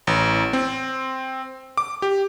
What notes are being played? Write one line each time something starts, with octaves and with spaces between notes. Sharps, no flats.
A1
C4
D6
G4